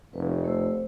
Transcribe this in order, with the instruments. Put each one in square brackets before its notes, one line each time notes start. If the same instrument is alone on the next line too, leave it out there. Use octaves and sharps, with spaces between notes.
[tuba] F1 [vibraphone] B4
[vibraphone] A3 C5 E6